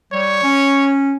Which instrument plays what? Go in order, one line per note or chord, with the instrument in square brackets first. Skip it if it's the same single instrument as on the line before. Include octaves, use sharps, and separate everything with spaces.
[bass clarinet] G3 [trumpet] C#5
[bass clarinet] C#4